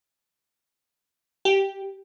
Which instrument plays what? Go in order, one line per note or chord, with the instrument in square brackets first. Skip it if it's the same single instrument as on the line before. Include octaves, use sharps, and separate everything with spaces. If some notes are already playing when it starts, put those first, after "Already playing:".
[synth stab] G4